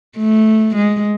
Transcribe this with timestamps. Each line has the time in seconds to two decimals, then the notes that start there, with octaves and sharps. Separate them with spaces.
0.18 A3
0.76 G#3